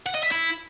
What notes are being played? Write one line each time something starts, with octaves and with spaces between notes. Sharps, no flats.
F#5
D#5
E5
E4